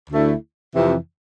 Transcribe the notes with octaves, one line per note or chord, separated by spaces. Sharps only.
D2 D3 A3 E4
F2 C3 E3